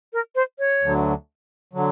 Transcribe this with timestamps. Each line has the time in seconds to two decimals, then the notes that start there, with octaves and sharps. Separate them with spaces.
0.13 A#4
0.35 C5
0.59 C#5
0.81 D2 D3 F#3
1.73 D3 F#3